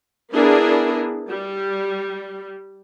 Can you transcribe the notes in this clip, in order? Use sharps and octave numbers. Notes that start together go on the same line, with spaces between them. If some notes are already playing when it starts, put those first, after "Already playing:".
B3 D4 E4 G#4 A#4
G3